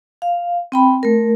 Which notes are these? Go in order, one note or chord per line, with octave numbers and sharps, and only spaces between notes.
F5
C4 G5 B5
A3 A#4